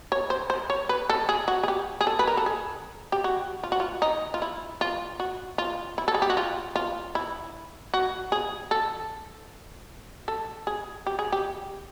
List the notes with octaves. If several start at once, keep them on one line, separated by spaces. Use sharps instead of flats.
C#5
C5
C5
C#5
B4
A4
G#4
F#4
G#4
G4
G#4
A4
B4
A#4
A4
G#4
G4
F#4
F4
F#4
F4
D#4
F4
E4
F4
F#4
F4
E4
A4
G#4
G4
F#4
F4
F4
E4
F#4
G#4
A4
A4
G#4
G4
G#4
G4